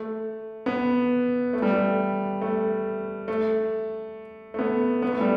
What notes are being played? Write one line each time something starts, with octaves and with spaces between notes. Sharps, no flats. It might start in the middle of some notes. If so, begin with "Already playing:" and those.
Already playing: A3
B3
A3
G3
A3
A3
A3
A3
B3
B3
A3
G3